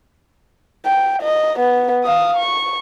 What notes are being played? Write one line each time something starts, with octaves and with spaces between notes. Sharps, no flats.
G5
D#5
B3
F5 D#6
C#6